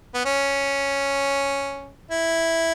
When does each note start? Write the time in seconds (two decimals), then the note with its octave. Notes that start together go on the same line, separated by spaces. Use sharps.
0.14 B3
0.25 C#4
2.11 E4